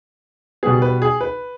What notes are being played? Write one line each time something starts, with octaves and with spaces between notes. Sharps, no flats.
B2 G3 B3 G#4
B4
G#4
B4